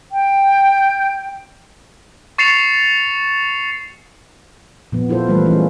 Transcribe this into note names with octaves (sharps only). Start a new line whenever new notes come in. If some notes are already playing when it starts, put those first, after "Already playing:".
G5
C#6 A6 C7 C#7 E7 F7
A#2 F3 B3
E4 F4 A4 C5
E3 G3 A3 A#3 A4 B4
E3 G#3 A#3 C#4 F4